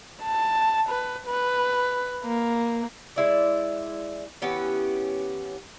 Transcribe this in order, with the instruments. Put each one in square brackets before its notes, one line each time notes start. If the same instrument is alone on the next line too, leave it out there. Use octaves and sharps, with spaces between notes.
[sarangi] A5
B4
B4
A#3
[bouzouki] G#3 E4 D5
E3 B3 C#4 G4